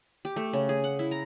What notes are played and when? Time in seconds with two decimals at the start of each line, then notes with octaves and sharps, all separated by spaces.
0.25 G4
0.36 A3
0.53 C#3
0.69 G#4
0.84 F#5
0.99 E4
1.11 A#5